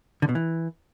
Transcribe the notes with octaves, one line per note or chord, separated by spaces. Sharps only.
D3
B2
E3